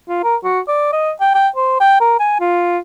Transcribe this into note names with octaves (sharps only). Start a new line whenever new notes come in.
F4
A#4
F#4
D5
D#5
G5
G5
C5
G5
A#4
G#5
F4